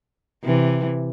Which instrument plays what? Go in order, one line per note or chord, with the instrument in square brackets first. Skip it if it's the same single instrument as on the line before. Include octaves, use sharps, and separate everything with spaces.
[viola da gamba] C3 E3